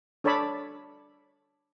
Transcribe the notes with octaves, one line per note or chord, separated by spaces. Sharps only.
D4 A4 C#5 D5 A5 B5